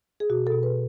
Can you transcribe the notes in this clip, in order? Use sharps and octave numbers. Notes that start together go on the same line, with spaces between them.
G#4
B2 F#4
A4
B2
B4